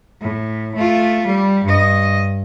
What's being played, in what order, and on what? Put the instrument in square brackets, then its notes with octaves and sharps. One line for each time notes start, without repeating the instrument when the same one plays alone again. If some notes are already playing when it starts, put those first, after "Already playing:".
[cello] A2
A3 F4
G3
G2 D#5